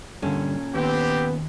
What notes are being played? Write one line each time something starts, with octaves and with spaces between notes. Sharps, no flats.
G2 A#2 D3 C#4 A4
D#2 B3 C4 G4